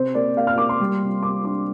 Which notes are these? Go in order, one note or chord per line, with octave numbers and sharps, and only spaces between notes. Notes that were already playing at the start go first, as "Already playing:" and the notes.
Already playing: C3 C5
A#3 D5
A#3 F5
F6
A#3 D6
C6
G3
C3
C3 D6
D4 D6